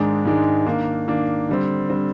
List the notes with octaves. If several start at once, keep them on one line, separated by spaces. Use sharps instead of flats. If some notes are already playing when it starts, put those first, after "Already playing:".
Already playing: G#2 D#3 G#3 D4
G#2 D#3 G#3 D4
D#3 A#3 D4
D#3 A#3 D4
D3 G3 C4
D3 G3 C4